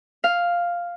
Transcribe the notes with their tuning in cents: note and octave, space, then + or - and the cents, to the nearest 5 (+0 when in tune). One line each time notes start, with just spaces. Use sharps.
F5 +0